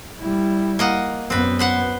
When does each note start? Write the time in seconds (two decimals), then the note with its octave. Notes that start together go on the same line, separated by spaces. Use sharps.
0.20 G3 E4
0.79 A#3 D#5 F#5
1.30 F#2 B3 C4 B4
1.59 B4 C5 F#5